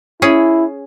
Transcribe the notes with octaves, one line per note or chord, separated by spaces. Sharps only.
C#4 E4 G#4